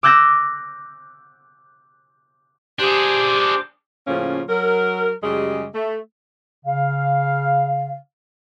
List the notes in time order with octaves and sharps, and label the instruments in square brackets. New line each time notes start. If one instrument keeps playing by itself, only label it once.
[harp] D6 E6 F#6 G6 A#6 E7
[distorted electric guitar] D4 G#4 [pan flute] G4 [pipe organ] C5 D6
[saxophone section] A2 C#3 F3 A#3 C#4 F4
F#3 A#4
F#2 C#3 G3 G#3 G4 D#5
A3
[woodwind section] C#3 F5